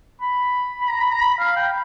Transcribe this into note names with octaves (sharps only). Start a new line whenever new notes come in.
B5
B5
A#5
B5
A#5
B5
F5
G5